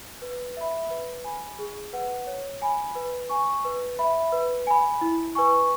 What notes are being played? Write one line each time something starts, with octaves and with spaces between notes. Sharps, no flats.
B4
E5 B5
B4
G#5 B5
G#4
B4 F#5
C#5
G#5 B5
B4
G#5 C#6
B4
E5 B5
B4
G#5 B5
E4
B4 G#5 C#6